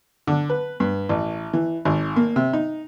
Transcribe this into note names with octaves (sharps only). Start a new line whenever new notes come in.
D3
B4
G2
A1
E3
G#1
A#3
C3
D#4